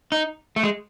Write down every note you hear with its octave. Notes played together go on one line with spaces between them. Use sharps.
D#4
A3
G#3